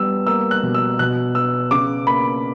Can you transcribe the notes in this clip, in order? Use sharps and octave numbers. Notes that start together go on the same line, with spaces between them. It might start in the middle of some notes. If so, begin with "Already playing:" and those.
Already playing: G3 B3 E6
A#3 E6
F#6
B2
E6
B2 F#6
B3 E6
C#3 D6
A#3 B5